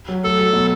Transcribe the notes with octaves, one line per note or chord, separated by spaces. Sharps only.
F#3
A3 A4
F#3
B2